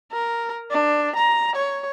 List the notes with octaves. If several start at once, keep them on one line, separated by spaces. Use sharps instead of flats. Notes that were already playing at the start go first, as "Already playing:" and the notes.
A#4
D4
A#5
C#5